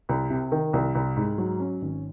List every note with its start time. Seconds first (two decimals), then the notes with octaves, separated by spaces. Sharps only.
0.09 C2
0.30 C3
0.52 D#3
0.73 C2
0.95 C2
1.16 G#2
1.38 F#3
1.60 C#4
1.82 G#1